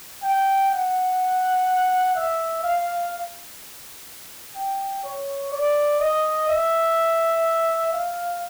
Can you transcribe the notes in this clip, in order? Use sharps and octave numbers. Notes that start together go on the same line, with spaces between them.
G5
F#5
E5
F5
G5
C#5
D5
D#5
E5
F5